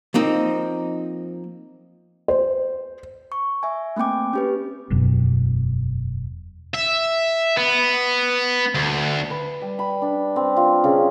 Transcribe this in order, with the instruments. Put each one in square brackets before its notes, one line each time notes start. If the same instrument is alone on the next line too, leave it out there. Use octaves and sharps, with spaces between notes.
[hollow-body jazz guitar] F3 A#3 C4 D#4
[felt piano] C5
[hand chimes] C#6
E5 G#5
A3 A#3 C4 G5 D6
C#4 G4 B4
[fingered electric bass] E1 F#2 B2
[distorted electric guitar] E5
B3
D2
[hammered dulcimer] B4
G3
B5
D4
C4
F4
C#3